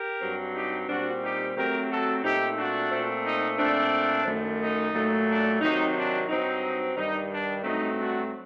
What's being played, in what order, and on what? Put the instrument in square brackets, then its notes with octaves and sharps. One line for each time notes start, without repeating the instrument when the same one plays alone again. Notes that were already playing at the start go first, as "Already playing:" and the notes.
Already playing: [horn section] G4 A#4
G2 F#3 C4
D#4 G4
A#2 G3 C4 D4 F#4
D#4 G4
C3 F#3 A3 C4 G4 A#4
F#4 A4
A#2 A3 C4 D#4 G4
D4 F#4
A#2 A3 C4
D#4
A#2 A3 C4 D4
F#2 D#3 A3
D#4
A#2 F#3 A3
D4
C3 D#3 F#3 C4 D#4
D4
G2 F#3 C4 D#4
G2 D#3 G3 D#4
D4
G2 F#3 A3 C4 D#4
D4 F#4